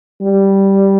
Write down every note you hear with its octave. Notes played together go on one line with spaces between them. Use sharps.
G3